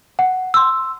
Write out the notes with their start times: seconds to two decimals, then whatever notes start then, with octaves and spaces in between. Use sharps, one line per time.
0.19 F#5
0.54 C6 E6